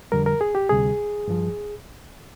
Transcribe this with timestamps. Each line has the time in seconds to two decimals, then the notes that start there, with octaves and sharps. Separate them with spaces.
0.12 F2 D3 G3 A#4
0.26 A#4
0.41 G#4
0.55 G4
0.69 D2 C3 G3 G#4
1.28 G2 F3